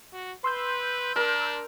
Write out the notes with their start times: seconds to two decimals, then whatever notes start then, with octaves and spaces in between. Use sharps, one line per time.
0.13 F#4
0.44 B4 C6 E6 G6
1.16 D4 A#4